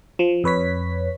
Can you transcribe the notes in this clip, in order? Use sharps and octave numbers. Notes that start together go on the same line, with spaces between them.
F3
F2 B4 C#5 B6